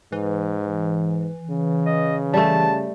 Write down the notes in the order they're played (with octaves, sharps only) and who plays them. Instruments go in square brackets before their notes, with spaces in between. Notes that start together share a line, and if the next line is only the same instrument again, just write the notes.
[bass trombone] G#2 [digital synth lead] E3
[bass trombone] C#3
[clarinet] D#5
[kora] G3 A3 [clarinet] A5